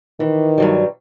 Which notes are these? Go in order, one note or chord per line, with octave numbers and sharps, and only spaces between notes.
D#3 E3
G2 F#3 G3